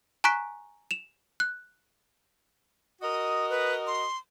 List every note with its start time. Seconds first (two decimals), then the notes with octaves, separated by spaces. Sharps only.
0.24 G#5 A#5 C#6 F#6 B6 D7
0.91 E7 F7
1.40 F#6
3.02 F#4 A#4 D#5 D#6
3.50 B4
3.87 C6